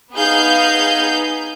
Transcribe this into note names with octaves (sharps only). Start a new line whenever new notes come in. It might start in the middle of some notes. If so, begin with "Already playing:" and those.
B3 D#4 G#4 F5 G6